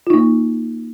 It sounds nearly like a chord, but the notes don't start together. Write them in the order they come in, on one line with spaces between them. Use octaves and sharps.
F4 D#4 A#3